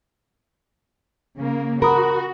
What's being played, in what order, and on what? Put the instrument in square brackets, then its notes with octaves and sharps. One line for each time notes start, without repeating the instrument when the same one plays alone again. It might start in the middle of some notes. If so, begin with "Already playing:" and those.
[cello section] C#3 A#3
[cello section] F#4 [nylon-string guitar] A#4 [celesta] B5 D#6